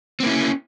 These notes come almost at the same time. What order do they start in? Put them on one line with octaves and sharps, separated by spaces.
C4 A#3 E4 C#4